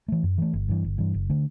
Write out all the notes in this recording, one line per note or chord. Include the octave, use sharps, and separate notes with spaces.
E3 A3
F#2
E3 A3
G1
G2 E3
G1
G2 E3
F#1
D3 A3